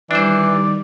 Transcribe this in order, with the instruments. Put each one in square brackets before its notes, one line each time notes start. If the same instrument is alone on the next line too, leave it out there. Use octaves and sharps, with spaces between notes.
[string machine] D#3 G3 [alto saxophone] E3 [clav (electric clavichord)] D4 C5 [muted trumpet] D5